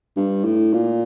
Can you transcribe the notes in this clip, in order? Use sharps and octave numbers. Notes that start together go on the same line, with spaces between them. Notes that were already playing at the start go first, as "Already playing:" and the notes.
G2
A2
A#2